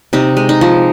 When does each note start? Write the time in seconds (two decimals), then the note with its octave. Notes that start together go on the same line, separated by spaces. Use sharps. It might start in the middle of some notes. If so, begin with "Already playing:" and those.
0.13 C3 D#4
0.37 G#3
0.49 D#4
0.61 F3